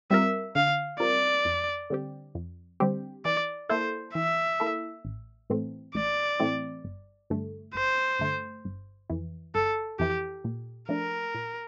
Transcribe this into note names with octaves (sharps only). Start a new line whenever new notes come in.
G3 C4 F4 A#4 E5
D3 F5
G3 C4 F4 A#4 D5
F2
D3 G3 C4 G4
F2
D3 G3 C4 G4
E3 D5
A#3 E4 A4 C5
E3 E5
A#3 E4 A4
A1
A2 E3 A3 C4
A1 D5
A2 E3 A3 C4
G1
G2 D3 A3
G1 C5
G2 D3 A3
G1
F2 E3
G1 A4
F2 E3 G4
A#2
F3 A3 D4 A#4
A#2